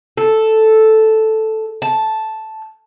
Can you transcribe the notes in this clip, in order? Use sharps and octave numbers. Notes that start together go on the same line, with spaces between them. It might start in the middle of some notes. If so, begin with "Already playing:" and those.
A4
A5